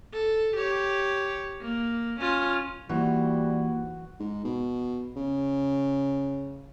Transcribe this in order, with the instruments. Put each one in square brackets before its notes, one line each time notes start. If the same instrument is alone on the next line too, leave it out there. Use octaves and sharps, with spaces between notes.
[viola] A4
G4 C#5
A#3
C#4 F4
[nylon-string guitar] E3 [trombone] G3 [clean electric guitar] A#3 D#4 C5 [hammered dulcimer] F#4
[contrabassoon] G#2
B2
C#3